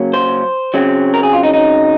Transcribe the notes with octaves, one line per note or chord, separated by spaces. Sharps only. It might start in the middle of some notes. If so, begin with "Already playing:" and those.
Already playing: F#2 C#3 F#3 A#3 C#4
C5
C#3 F#3 C4
A#4
G#4
F4
D#4
D#4